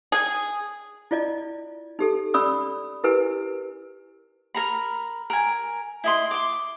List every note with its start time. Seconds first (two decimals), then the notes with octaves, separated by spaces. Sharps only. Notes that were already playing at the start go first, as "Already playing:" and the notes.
0.12 G#4
1.11 E4 F4 D5 D#5
1.99 D#4 G4 A4
2.34 C#4 D5 B5 C#6 D#6 E6
3.04 E4 G4 A#4 B4 G#5
4.55 A#4 A#5 B5
5.30 A#4 G#5
6.04 E4 D#5 C6
6.31 C6 D6